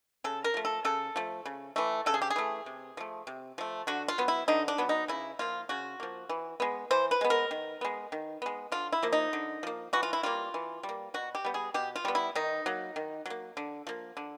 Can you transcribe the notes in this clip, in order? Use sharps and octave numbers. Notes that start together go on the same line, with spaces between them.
C#3 A4
A#4
F3 A3
A4
C#3 A4
F3 A3
C#3
E3 A3
C#3 A4
G#4
G4
G#4
E3 A3
C3
F3 A3
C3
F3 A3
D3 F#4
F4
F#3 B3
E4
D3 D#4
D4
F#3 B3
D#4
C#3 E4
F3 A#3 F4
C#3 F#4
F3 A#3
E3
G#3 B3
E3 C5
B4
G#3 B3
A#4
D#3
G#3 B3
D#3
G#3 B3
D3 F4
E4
F3 A#3
D#4
D3
F3 A#3
E3 F#4
F4
E4
G3 A#3 F4
E3
G3
A#3
B2 F#4
G4
G3 B3
G#4
B2 G4
F4
G3 B3
E4
D#3 D#4
F#3 A#3
D#3
F#3 A#3
D3
F3 A#3
D3